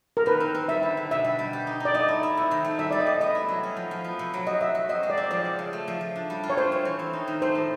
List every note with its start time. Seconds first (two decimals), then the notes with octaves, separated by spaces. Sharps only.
0.17 A#4
0.26 D#3 B4
0.40 C4
0.55 C4
0.68 G3 E5
0.83 D3
0.97 D3
1.11 B2 E5
1.24 G3
1.39 G3
1.53 G4
1.67 D#4
1.80 D#4
1.85 D5
1.94 A3 D#5
2.08 E4
2.23 E4
2.37 C3
2.51 D#3
2.65 A3
2.79 G3 E5
2.91 G3 D5
3.00 D#5
3.07 G3
3.21 B3 D#5
3.35 E4
3.48 F#3
3.63 C#4
3.77 F3
3.91 F3
4.04 B3
4.19 C3
4.34 F#3
4.47 F#4 D#5
4.61 F#4 E5
4.75 F#4
4.89 C4 D#5
5.03 G#3
5.10 D5
5.17 C4
5.31 F3 D5
5.45 C#3
5.59 C#3
5.73 A3
5.88 F3
6.01 F3
6.15 D4
6.30 G3
6.43 F4
6.50 C#5
6.57 A3 C5
6.72 C#4
6.85 E3
6.99 C4
7.13 D#4
7.28 D#3
7.42 A3 C5
7.55 A2